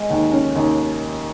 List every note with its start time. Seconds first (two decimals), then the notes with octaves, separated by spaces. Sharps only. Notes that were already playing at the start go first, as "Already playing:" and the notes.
Already playing: G#3
0.10 D#2
0.32 C#4
0.55 D#2